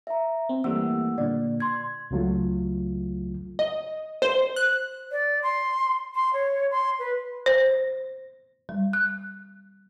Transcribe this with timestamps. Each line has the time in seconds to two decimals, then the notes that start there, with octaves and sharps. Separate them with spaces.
0.07 E5 A#5
0.49 C4
0.64 E3 G3 A3 A#3 F#5 E6
1.18 A#2 D3 D5
1.60 C6 G#6
2.11 C#2 C#3 F#3 A3 F4
3.59 D#5
4.22 C5
4.56 F#6
5.12 D5
5.43 C6
6.15 C6
6.34 C#5
6.71 C6
6.99 B4
7.46 C5
8.69 G3
8.93 F#6